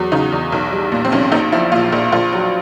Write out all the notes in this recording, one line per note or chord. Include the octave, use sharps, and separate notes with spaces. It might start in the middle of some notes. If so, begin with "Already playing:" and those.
Already playing: E2 F#3
C#3 D#4
E2
B1
G3
A#2
C4
B1 C#4
A#1 D#4
F3 E4
A#2 F4
A#1
A#1 F4
F#3